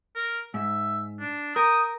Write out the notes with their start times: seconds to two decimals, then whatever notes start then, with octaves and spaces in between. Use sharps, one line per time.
0.15 A#4
0.54 G#2 E5
1.20 D4
1.56 A#4 G5 D#6